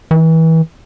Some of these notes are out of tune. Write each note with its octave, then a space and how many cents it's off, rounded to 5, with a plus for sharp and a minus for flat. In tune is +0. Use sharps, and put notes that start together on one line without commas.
E3 -30